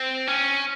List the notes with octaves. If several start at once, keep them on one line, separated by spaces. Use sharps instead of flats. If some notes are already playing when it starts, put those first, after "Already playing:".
Already playing: C4
C#4